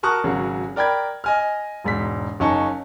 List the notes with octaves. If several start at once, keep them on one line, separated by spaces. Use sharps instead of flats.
F#4 A#4 A5 C#6 D#6 F#6
G#1 C#3 F#3
A#4 D5 G5 B5 G#6
D#5 G#5 F6
E1 G#2 B6
F#1 C#4 D#4 A5 C#6